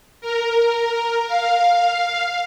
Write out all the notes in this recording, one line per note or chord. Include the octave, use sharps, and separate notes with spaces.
A#4
F5